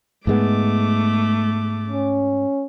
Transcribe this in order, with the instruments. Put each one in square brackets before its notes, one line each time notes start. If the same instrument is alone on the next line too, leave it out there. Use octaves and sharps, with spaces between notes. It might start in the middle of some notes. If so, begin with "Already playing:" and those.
[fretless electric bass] G#2 G#3 B3 [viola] A3 D6
[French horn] C#4